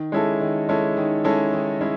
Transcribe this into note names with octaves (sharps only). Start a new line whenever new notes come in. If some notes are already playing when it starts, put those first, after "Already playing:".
Already playing: D#3
G#3 C#4 E4 A4
D#3
G#3 C#4 E4 A4
D#3
G#3 C#4 E4 A4
D#3
G#3 C#4 E4